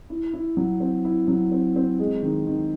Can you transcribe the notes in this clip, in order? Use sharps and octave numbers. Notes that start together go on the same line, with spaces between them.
E4
E4
F#3
C4
E4
F#3
C4
C4
G#3
D#3
D#3